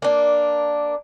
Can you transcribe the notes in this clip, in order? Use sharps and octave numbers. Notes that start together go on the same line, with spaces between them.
A#3 D4